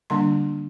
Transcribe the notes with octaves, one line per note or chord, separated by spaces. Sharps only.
D3 G3 A#3 D4 C6